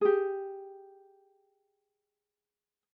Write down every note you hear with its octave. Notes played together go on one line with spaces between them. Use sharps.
G4 G#4